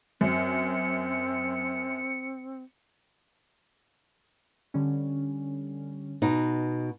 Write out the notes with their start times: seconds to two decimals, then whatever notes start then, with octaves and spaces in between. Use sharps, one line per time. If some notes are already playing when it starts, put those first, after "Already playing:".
0.21 F#2 C4 C#7
4.74 D3 G3 C#4
6.22 B2 D#4